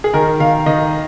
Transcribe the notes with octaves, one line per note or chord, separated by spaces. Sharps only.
G#4
D#3 A#4
D#3 F5
D#3 D#5